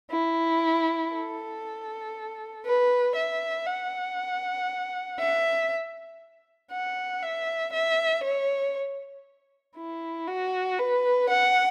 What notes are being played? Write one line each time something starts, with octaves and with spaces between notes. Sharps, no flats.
E4
A4
B4
E5
F#5
E5
F#5
E5
E5
C#5
E4
F#4
B4
F#5